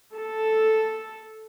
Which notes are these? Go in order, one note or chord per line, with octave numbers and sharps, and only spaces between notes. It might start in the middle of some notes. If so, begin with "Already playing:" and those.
A4